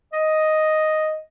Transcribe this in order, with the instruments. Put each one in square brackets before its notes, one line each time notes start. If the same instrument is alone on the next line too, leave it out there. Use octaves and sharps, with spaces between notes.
[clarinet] D#5